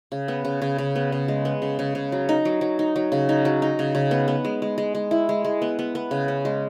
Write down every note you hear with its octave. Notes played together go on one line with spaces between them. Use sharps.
C#3
B3
C#3
C#3
C#3
B3
C#3
G#3
B3
C#3
C#3
C#3
F#3
D#4
F#3
F#3
D#4
F#3
C#3
D#4
F#3
D#4
C#3
C#3
B3
B3
G#3
G#3
G#3
G#3
E4
G#3
G#3
B3
B3
B3
C#3
C#4
G#3